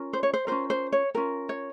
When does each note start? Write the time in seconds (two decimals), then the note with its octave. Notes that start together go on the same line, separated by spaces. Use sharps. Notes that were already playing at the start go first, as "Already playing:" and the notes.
Already playing: C#4 F4 A#4
0.13 C5
0.23 C#5
0.34 C5
0.47 C#4 F4 A#4 C5
0.70 C5
0.92 C#5
1.15 C#4 F4 A#4
1.49 C#5